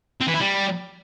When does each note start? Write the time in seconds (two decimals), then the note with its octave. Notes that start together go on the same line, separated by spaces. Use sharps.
0.21 C4
0.27 E3
0.34 E4
0.41 G3